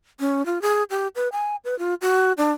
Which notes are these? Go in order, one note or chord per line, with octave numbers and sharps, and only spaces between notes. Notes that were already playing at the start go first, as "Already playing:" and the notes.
C#4
F4
G#4
G4
B4
G#5
B4
F4
F#4
D4